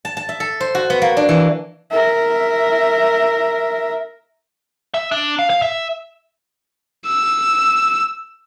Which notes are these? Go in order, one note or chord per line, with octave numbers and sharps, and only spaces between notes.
A5
A5
E5
A4
C5
F#4
B3
A#3
D4
E3
A#4 E5
E5
D4
F5
F5
E5
E6